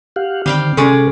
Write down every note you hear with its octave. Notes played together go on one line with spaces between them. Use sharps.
G4 F5 F#5
D3 D#3 G3 C4 F5 G5
C3 G#3 C#4 A4 D5